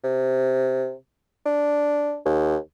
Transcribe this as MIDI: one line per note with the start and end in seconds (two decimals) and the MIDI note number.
0.04 0.93 48
1.46 2.17 62
2.25 2.56 39